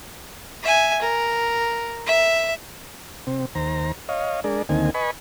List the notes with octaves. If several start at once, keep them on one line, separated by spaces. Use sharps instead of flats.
E5 G#5
A#4
E5
C3 C4
D#2 C5 A#5
C#5 D#5 F5
G#3 D4 G#4 A#4 D5
D2 D#3 A#3 C4 D#4 G#5
B4 D#5 G#5 B5 C#6